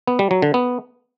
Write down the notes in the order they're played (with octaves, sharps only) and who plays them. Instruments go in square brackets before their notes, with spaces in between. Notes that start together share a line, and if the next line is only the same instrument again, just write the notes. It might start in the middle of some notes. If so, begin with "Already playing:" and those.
[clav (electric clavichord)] B3
G3
F#3
D3
B3